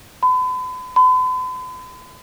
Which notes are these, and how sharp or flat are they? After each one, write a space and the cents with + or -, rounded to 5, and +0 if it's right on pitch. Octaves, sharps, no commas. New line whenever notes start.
B5 +40
B5 +45